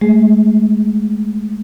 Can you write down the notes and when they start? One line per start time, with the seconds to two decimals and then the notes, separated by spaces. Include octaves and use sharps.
0.01 G#3 A3 G#4